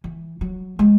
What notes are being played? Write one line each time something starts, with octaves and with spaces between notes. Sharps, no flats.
E3
F#3
G#3